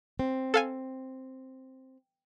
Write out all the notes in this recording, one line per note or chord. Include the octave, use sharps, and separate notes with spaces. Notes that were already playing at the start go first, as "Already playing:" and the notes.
C4
A4 F5 G#5